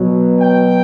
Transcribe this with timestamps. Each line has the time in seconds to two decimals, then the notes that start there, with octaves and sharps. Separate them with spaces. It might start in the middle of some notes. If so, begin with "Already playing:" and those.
Already playing: B2 F#3
0.40 G5